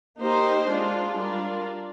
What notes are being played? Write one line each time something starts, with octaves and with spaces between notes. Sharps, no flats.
A#3 D#4 G4 C5
G#3 D4 F4
G3 D4 F4 A#4 D5